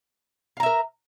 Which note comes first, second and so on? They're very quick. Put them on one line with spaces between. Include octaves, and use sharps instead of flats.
F5 A#5 E5 A#4